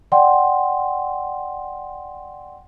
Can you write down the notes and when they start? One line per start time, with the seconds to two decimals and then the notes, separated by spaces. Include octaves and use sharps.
0.12 D5 F#5 G5 C6